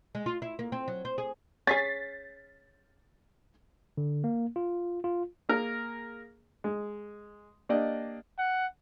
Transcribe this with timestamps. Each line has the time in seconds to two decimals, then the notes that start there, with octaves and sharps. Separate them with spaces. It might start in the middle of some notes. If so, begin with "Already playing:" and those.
0.15 G#3
0.26 F4
0.42 E4
0.59 A#3
0.72 C4
0.88 F#3
1.05 C5
1.18 G#4
1.67 C#4 G#4 A6 B6 C7
3.97 D3
4.24 A#3
4.56 F4
5.04 F4
5.49 A#3 G#4 A#4
6.64 G#3
7.69 A#3 D4 G4 D5 D#5
8.39 F#5